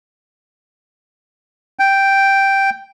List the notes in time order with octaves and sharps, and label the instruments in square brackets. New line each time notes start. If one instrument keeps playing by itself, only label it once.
[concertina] G5